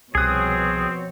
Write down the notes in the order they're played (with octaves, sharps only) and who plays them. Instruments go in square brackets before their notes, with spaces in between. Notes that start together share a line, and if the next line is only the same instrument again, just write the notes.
[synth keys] C2 D#6 [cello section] B2 F3 C#5 [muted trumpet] C4 [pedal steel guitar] G#4 F#6